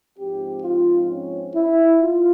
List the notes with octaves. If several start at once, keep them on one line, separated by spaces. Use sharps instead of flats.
G#2 F3 C4 G4
F4
C#4
E4
F4